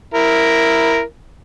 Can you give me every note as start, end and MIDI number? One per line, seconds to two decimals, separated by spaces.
0.14 1.01 64
0.14 1.01 70